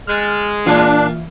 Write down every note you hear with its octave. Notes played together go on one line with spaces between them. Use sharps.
G#3 F6 F#6 A6
A#2 E3 D4 F4